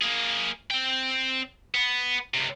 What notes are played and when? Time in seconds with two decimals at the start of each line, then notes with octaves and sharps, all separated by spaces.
0.02 A#3 G#4
0.71 C4 G5
1.75 B3
2.34 C#2 C3